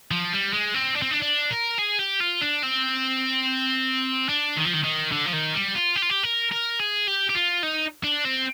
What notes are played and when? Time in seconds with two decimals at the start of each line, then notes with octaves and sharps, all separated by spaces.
0.11 F3
0.33 G3
0.53 G#3
0.74 C4
0.95 D4
1.02 C4
1.11 D4
1.22 D4
1.51 A#4
1.79 G#4
1.99 G4
2.20 F4
2.41 D4
2.62 C4
4.29 D4
4.57 D#3
4.65 F3
4.74 D#3
4.84 D#3
5.12 D3
5.26 F3
5.33 D#3
5.54 G3
5.75 F4
5.96 G4
6.02 F4
6.10 G4
6.23 A#4
6.51 A#4
6.79 G#4
7.07 G4
7.29 G4
7.35 F4
7.63 D#4
8.04 D4
8.25 C4